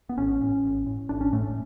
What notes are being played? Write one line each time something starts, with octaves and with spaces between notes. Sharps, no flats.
B3
A1 C#4
A2
A1
A2
A1 D4
C#4
A2 A3